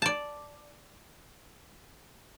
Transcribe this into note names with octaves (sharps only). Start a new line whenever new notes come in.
D5 A5